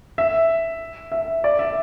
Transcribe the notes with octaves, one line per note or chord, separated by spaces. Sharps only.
E5
E5
D5
E5